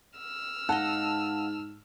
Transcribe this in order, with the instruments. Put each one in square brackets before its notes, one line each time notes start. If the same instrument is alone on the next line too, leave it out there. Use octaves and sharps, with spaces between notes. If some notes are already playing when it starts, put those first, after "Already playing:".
[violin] E6 F6
[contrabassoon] G#2 [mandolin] D#5 F5 F#5 [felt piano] A5